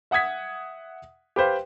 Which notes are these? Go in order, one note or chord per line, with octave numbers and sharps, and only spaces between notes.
E5 F#5 D#6 G#6 B6
G4 B4 C5 F5